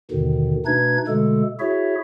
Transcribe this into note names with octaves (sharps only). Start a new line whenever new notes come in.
D#2 G#2 B2 D3 D#3
B2 A3 D4 D#4 B4 G#6
B2 D3 G#3 A3 A4
E4 F#4 G#4 C#5 E5